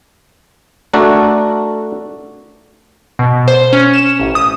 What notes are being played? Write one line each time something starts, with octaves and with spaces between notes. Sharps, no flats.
A3 D4 F#4 A4 A#4
B2
C5
C#4
E7
A1
D#6